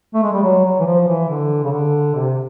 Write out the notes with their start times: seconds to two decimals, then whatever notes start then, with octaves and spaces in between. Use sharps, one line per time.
0.14 A3
0.23 G#3
0.33 G3
0.43 F#3
0.65 F#3
0.79 E3
0.86 F3
1.07 E3
1.29 D3
1.64 C#3
1.72 D3
2.15 C3